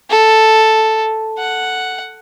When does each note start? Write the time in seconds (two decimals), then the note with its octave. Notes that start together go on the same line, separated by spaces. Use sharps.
0.10 A4
1.38 F#5